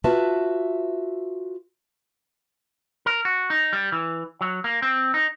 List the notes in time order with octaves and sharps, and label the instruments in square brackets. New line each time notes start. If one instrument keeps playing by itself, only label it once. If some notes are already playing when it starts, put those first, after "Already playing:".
[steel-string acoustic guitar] F4 F#4 B4 E5 A5
[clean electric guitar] A#4
F#4
D#4
G3
E3
F#3
A#3
C4
D#4